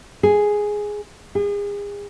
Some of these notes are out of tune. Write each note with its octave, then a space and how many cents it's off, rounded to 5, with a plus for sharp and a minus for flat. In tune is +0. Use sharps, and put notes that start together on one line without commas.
G#4 +0
G#4 -35